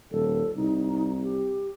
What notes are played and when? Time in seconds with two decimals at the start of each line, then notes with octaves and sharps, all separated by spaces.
0.11 D#1 A4
0.57 C2 D#4
1.23 G4